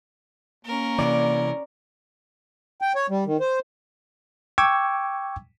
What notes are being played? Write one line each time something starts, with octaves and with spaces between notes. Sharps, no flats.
A#3 C#4 A#4
C3 E3 D5
G5
C#5
G3
D#3
C5
G5 C#6 D6 E6 G#6